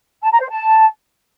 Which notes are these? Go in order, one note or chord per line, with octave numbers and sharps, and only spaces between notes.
A5
A#5
C5
A5